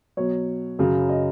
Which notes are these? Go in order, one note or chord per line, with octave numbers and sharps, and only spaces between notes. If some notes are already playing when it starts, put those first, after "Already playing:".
B2 F#3 C#5
F#2 C#3 F#3
D#5